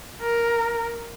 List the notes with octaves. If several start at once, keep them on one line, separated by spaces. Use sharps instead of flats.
A#4